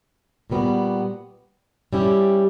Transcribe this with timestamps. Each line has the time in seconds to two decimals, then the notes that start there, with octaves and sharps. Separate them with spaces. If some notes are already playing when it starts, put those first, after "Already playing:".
0.50 A#2 G3 B3 F#4
1.93 G3 C#4 E4 G4